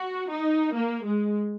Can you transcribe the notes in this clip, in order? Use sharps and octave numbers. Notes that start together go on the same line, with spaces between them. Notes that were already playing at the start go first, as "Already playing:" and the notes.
Already playing: F#4
D#4
A#3
G#3